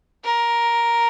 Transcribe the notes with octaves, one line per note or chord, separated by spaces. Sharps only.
A#4